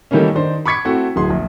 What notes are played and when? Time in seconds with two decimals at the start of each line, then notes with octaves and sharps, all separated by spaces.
0.11 D#3 E3 G3 A3 A#3 C#4
0.35 D#3 D4 C5
0.66 B5 C#6 D6 G#6 B6 C#7
0.85 A3 C4 E4 F#4
1.16 D1 G#4 C6
1.30 A#1